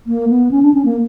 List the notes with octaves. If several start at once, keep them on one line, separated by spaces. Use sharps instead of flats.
A#3
B3
C#4
D4
C#4
A#3